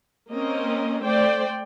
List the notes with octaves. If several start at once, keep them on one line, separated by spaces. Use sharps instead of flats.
A#3 C4 C#4 A#4 D#5
A3 C5 D5 G5